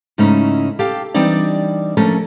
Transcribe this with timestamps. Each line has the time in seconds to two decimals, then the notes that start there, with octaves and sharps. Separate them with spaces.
0.18 G#2 C#3 A3 C#4 D#4 E4
0.79 G4 A4 F5 G5
1.14 E3 G3 C4 D4 D#4 D5
1.97 F3 A3 C#4 D4 A4 A#4